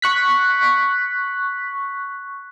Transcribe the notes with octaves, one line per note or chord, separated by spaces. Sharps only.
C#6 F#6 B6